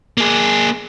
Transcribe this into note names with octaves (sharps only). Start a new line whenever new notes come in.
A#3 G#4